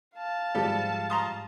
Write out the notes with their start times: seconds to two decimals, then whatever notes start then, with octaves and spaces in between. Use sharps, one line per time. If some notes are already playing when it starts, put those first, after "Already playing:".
0.16 F5 A5
0.55 G#2 F3 G3 G#3 G4 A4
1.10 A#5 C6 D#6